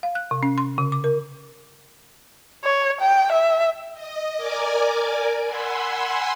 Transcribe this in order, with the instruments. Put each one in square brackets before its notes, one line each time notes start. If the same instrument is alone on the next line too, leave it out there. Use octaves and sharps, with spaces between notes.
[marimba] F5
F#6
C3
C#4
C6
C#3
D6
A#4
[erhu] C#5
G5
E5
[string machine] D#5
A#4 D5 G#5 D6
F#5 G#5 B5 C6 E6